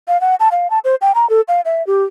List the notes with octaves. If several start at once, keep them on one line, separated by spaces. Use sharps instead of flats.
F5
F#5
A5
F5
A5
C5
G5
A#5
A4
F5
E5
G4